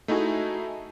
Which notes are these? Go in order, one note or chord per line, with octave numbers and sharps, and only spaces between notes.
A3 D#4 E4 F#4 G#4